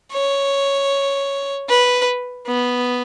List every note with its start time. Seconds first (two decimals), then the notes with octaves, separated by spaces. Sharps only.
0.13 C#5
1.69 B4
2.47 B3